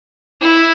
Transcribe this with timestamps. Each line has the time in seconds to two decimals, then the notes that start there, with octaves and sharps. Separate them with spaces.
0.41 E4